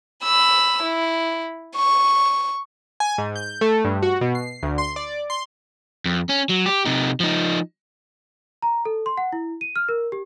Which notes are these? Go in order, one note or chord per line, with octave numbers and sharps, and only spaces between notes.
B5 E6
E4
C#6
G#5
G#2
G6
A3
G2
F#4
B2
C7
D2
C6
D5
C6
F2
C#4
F#3
G4
C3 D#4
F3 D#4
A#5
A4
C6
F#5
E4
D#7
F6
A#4
G4